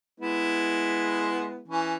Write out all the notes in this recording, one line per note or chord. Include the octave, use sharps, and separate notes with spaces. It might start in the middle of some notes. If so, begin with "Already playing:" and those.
G#3 B3 E4
E3 C#4